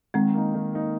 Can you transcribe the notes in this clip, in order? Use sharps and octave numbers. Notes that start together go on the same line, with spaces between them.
D#3 G#3 C4
A#3 D#4
D#3
A#3 D#4